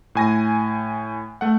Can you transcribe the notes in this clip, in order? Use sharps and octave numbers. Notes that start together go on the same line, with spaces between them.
A2 G#5 A#6
A3 F#5